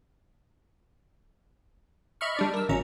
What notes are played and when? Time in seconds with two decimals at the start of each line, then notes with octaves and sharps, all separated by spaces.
2.21 D#5 E5 B5 C#6 F6
2.37 G3 D4 D5
2.54 A#4 E6
2.69 G#1 E2 C#4 A#5